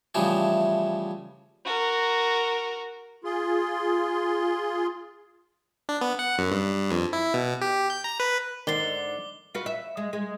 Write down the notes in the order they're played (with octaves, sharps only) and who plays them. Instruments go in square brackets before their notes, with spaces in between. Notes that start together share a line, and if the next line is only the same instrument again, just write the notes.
[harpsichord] C#3 E3 F3 G3 A3 G#4
[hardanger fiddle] F#4 A#4
[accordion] F4 G#4 C6
[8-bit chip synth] D4
B3
F#5
F#2
G2
F2
E4
B2
G4
G6
A#5
B4
[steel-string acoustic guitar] G#2 D3 [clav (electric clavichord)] D#3 [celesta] D5 A6 C7 [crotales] D6 G7
[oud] F4 F#4 B4
E5
G#3
G#3